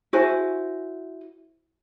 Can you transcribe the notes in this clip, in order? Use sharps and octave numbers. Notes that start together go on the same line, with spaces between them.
E4 F#4 C5 G#5